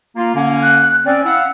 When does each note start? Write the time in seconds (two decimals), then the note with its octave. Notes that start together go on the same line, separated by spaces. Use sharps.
0.16 A#3 F4
0.35 D3 A#3 C#4
0.63 F#6
1.06 C4 C#4 D5
1.25 E4 F5 F#5 E6